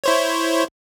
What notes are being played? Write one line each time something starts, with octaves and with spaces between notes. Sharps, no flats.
E4 C5 C#5